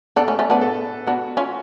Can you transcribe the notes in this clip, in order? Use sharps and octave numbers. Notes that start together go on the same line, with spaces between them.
B3 D4 A4
A3 C#4
A3 C#4
B3 D4 B4
A4
B3 D4 F#4
C#4 F4